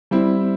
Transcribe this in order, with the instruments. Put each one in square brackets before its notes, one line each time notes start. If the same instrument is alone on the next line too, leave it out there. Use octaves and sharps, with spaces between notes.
[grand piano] G3 C4 E4